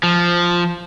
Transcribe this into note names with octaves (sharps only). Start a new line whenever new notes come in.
F3